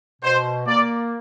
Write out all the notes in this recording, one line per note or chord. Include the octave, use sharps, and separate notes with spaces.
B2 C5
A#3 D5